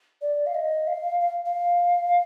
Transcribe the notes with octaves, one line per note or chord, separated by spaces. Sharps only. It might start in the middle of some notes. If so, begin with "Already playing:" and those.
D5
F5
D#5
F5
F5
F5